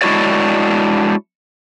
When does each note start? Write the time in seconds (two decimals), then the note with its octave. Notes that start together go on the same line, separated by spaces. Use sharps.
0.02 G#3 D4 E4 F#4 C#5 D5